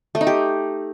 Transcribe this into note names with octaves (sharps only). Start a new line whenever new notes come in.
A3
D#4
G4